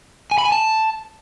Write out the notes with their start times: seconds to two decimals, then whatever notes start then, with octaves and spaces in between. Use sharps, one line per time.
0.31 G#5
0.38 B5
0.45 G#5
0.52 A5